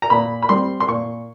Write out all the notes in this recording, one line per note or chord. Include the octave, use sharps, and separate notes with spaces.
A#5
A#2 B5
B5
G3 C4 C6
C6
A#2 C#6